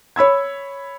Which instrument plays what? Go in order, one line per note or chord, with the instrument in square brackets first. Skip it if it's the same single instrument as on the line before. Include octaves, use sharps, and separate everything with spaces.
[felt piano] C#5 B5 E6 G#6